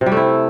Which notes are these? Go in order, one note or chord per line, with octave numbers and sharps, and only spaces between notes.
C3
G3
A3
E4